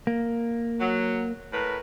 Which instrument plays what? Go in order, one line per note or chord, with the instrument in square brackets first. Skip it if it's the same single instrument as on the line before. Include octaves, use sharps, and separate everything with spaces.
[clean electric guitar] A#3
[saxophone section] F#3
A2 A#4 B4